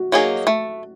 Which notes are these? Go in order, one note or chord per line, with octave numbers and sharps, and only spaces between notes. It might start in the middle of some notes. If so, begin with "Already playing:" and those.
Already playing: F#4
F#3 A#3 D#4 G#4
A3